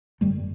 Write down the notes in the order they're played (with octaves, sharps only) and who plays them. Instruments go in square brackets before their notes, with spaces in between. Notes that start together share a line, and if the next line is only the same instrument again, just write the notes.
[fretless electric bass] G#1 F#2 D3 G3 A3